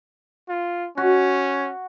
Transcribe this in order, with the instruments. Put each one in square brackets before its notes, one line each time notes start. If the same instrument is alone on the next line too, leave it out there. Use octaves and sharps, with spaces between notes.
[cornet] F4
[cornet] C#4 [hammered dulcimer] F#4